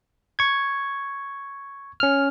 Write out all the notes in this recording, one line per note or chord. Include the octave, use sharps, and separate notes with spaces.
C#6 G#6
C#4 F6